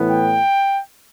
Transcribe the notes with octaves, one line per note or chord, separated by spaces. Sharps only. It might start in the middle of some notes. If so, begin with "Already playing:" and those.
Already playing: A2 E3 B3
G5